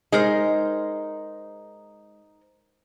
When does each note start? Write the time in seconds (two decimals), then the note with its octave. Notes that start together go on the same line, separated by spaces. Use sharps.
0.12 G#3 D#4 A#4 C5